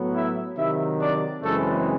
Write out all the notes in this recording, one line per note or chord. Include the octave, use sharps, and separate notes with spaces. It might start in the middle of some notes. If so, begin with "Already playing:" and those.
Already playing: A2 F#3 B3
E4 E5
C3 D#3 F#3 E4 E5
D4 D5
F#2 C#3 E3 G#3 A3 C4 A4